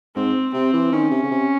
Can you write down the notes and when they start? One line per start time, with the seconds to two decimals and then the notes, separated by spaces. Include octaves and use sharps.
0.16 G#2 C4
0.53 C3 C4
0.73 E3
0.92 D#3 C#4
1.11 C3
1.23 C#3
1.31 C3